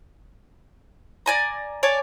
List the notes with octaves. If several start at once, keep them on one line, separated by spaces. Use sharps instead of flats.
D5 G#5 A#5
C#5 D5 G#5 A5